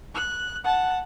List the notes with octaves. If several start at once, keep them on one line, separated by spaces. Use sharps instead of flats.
F#6
F#5 A5